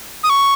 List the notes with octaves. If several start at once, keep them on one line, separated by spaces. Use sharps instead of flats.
D#6
C#6